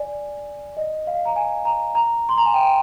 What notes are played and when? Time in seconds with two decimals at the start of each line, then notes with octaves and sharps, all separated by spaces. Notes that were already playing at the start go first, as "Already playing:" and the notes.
Already playing: D5 G#5
0.77 D#5
1.07 F5
1.25 A#5
1.36 G#5
1.65 A#5
1.95 A#5
2.29 C6
2.38 A#5
2.45 G#5
2.54 G5